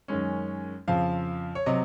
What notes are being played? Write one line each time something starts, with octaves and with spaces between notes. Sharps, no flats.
F#2 D#3 G#3 C#4
F2 C#3 F3 C4 F5
C#5
C3 F#3 C4 D#5